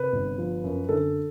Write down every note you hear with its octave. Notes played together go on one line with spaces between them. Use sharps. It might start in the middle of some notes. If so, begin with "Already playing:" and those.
Already playing: C3 B4
G1
F3
F#2
D3 A4